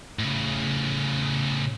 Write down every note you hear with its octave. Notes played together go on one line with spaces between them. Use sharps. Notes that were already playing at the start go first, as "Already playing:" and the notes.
A2 C#3